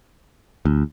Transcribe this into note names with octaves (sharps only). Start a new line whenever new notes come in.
D2